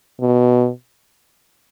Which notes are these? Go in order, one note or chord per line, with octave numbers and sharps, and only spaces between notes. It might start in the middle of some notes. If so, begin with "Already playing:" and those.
B2